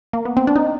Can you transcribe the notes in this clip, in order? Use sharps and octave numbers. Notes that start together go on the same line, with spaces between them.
A#3
B3
C4
D4
D#4